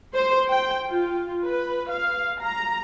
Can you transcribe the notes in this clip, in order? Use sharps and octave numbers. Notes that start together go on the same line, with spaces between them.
C5
G5
F4
B4
F5
A#5